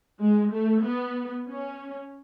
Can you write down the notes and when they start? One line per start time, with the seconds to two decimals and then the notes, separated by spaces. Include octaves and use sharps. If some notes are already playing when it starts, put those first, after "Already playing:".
0.22 G#3
0.53 A3
0.84 B3
1.48 C#4